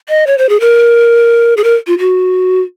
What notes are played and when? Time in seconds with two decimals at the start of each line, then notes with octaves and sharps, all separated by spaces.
0.09 D#5
0.27 C#5
0.38 C5
0.49 G#4
0.60 A#4
1.57 G#4
1.64 A#4
1.87 F4
1.99 F#4